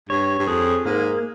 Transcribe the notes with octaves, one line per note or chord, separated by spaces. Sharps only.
G2 C#5
G2
F2 G#4
G#2 A#3